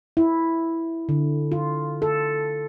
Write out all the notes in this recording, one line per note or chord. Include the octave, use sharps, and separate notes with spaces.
E4
D3
F4
A4